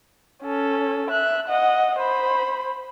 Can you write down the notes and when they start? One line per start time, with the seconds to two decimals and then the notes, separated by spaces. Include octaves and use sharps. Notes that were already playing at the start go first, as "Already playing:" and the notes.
0.43 C#4 A4
1.10 E5 F#6
1.48 D#5 F#5
1.99 C5 B5